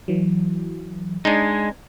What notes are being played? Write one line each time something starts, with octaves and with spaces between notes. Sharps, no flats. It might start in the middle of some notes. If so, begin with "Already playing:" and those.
E3 F#3
G#3 D4 D#4 G#6